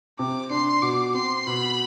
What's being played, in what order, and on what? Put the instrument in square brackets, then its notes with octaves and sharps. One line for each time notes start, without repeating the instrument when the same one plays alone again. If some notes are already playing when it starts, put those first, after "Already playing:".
[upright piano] C3 [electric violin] D6
[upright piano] D4 [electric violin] C6
[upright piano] B2 [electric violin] D6
[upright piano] C4 [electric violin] C6
[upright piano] B2 [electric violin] B5